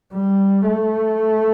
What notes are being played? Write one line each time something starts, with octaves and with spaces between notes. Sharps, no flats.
G3
A3